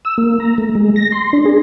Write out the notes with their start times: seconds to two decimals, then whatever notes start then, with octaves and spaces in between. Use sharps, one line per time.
0.05 E6
0.18 A#3
0.40 A#5
0.58 A3
0.75 G#3
0.96 A#6
1.12 C6
1.33 D4
1.45 G#4